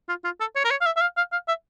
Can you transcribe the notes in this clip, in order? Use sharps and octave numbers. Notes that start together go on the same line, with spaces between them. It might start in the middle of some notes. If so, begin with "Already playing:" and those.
F4
F4
A4
C#5
A#4
C#5
F5
E5
E5
F5
F5
F5
E5